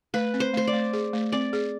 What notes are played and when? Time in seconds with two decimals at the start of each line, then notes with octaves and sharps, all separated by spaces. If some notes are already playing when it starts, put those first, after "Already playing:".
0.14 A3 B4
0.34 C4
0.40 C5
0.54 A3 C5
0.67 D5
0.73 A3
0.93 G#4
1.13 A3
1.32 C4 D5
1.53 G#4